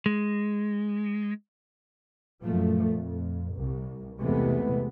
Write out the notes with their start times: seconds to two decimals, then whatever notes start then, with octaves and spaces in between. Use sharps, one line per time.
0.06 G#3
2.43 F#2 A#2 F3 A3
2.92 F2
3.55 C2
4.20 E2 C3 E3 G#3 A3 B3